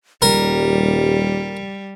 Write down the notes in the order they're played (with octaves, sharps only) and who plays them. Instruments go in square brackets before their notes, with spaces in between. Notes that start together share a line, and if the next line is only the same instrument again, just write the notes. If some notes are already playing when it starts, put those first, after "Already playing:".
[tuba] D#1 [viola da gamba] G3 [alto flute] G4 [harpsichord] A#4